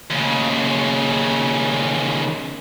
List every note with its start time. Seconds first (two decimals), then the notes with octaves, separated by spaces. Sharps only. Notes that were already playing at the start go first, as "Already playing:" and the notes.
0.10 D#2 C#3